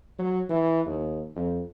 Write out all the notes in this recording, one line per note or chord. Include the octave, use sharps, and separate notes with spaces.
F#3
E3
D#2
F2